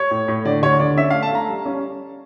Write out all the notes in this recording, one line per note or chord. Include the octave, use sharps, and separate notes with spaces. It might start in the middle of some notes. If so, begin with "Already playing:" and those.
Already playing: C#5
A2
A2
D3 D5
D2 C#5
D3 D5
C#4 E5
A3 F5
A5
A3 A#5
G3
C#4